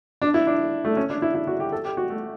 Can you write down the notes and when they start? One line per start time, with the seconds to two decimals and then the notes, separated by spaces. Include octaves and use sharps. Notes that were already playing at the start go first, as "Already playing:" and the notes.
0.22 D4
0.34 E4
0.47 D4
0.85 A3
0.97 C#4
1.10 D4
1.22 E4
1.34 E4
1.47 F#4
1.60 G4
1.72 A4
1.85 G4
1.97 F#4
2.10 A3